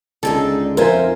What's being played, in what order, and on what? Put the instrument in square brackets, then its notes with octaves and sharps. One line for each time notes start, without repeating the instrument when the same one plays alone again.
[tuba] C#2 [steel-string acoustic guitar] D3 D#4 G#4 [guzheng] A4
[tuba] F2 [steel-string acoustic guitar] D#4 C5 E5 [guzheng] F4 G#5 [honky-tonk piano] A#4